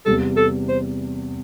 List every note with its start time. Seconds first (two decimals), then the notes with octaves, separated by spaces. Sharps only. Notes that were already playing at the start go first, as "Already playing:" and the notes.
0.05 E2 C3 G3 A4
0.37 A4
0.68 C5